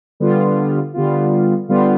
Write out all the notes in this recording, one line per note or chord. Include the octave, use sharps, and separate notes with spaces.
D3 G3 B3 F4
D3 G3 B3 F4
D3 G3 B3 F4